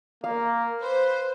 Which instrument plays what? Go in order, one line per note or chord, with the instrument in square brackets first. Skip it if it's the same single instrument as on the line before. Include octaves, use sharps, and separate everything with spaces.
[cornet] A#3 [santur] F5
[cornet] B4 [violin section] C5